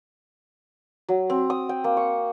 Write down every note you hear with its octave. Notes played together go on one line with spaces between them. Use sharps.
F#3
C4
D#6
G5
A#3
C#6